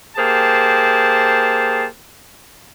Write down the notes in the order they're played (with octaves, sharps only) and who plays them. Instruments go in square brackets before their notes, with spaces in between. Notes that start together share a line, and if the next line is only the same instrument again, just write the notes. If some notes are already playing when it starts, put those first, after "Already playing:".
[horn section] A#3 G4 G#4 C5 A5